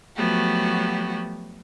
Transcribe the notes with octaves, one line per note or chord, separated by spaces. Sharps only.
F3 F#3 A3 B3 F#4 G4